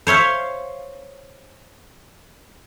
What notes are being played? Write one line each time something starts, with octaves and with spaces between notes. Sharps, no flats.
C5 C#5 E5 F5